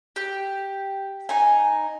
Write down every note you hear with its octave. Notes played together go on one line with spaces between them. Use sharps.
G4
D#4 G#5